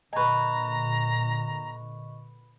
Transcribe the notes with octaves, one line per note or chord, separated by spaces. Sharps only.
A#2 D3 B4 D#5 G#5 A#5 C#6